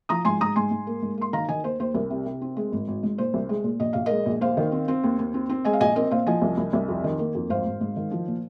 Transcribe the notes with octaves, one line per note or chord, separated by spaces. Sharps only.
F3 A#5 D#6
G#2 G#5 C6
G#2 A#5 D#6
G#2 G#5 C6
G#2
A#3
G#2
A#3 C6
D#3 F5 A#5
D#3 D#5 G#5
D#2 C5
D#2 C5
C2 A#4
C3
C3
C4
G#3
G#1
G#1
G#2
A#2 C5
C2
G#3
A#2
A#1 D#5
A#1 F5
G#3 A#4 D#5
A#1
D#2 C5 F5
D#3
C4
C4
D#2
D#2
C4
C4
G#3 D#5 G#5
F5
A#1 D#5 G#5
C4 A#4 D#5
A#2 C5 F5
F3 D#5 G#5
C2
C2
C2
F2
D#3
A#3
F2
G#1 C5 F5
G#1
G#2
D#3
F3
A#2